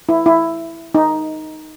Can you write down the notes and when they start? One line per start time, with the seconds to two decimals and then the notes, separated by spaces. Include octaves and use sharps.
0.09 E4
0.26 E4
0.95 D#4